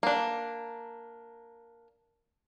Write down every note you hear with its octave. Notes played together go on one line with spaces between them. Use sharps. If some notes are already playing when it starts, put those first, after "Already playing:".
A#3 D4